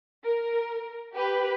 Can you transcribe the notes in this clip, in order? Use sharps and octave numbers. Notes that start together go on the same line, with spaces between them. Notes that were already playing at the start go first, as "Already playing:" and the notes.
A#4
G4 B4